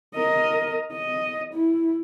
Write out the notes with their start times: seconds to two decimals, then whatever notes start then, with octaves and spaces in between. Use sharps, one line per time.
0.15 A#4 D#5
0.93 D#5
1.54 E4